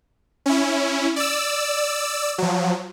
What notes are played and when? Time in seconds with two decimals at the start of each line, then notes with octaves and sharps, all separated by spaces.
0.46 C#4 E4
1.16 D5 E6
2.38 F3 F#3